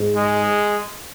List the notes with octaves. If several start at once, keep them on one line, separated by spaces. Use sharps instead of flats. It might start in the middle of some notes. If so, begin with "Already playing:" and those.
Already playing: G#2
G#3